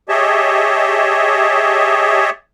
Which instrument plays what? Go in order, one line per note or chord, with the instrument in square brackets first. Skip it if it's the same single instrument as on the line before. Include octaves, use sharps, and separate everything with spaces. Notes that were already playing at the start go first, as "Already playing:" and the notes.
[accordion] G4 G#4 C#5 D#5 E5 A5